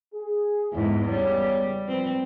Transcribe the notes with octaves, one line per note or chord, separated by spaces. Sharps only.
G#4
E2 G#2 B3 E4
C#3 G3 B3 C#5
F3 C4 B4